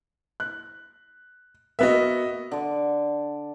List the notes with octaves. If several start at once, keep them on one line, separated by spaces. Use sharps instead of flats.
F#6
A#3 B3 F#4 D#5 E5
D3 D5